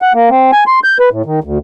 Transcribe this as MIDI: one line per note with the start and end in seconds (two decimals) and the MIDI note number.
0.02 0.13 78
0.14 0.30 58
0.30 0.51 60
0.52 0.64 80
0.67 0.80 84
0.84 0.98 91
1.00 1.09 71
1.12 1.22 45
1.26 1.40 51
1.44 1.58 38